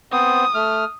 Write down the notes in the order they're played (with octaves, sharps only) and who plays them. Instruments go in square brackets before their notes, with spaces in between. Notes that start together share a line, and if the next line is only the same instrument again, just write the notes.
[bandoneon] B3 C4 C5 [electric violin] D#6
[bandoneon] A3 F6